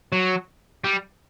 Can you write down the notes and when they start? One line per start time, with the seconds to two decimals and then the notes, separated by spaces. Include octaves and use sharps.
0.12 F#3
0.84 G3